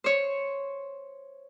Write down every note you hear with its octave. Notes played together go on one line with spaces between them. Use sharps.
C5 C#5